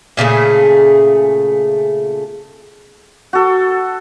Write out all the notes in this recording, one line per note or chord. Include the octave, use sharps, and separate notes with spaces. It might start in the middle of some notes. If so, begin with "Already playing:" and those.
A#2 C#3 A3 G#4
F#4 A4